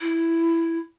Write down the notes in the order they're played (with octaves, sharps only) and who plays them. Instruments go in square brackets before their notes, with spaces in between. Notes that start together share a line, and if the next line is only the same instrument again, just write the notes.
[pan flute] E4